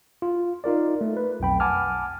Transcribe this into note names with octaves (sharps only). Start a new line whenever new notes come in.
F4
D#4 F4 A#4 D5
A3
B4
B1 F2 G5 B5
F#5 G#5 A5 D6 F6